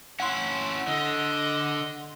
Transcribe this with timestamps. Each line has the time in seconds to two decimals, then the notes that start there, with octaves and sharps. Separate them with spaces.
0.20 C#4 E4 F#5 C6
0.88 D3 D#5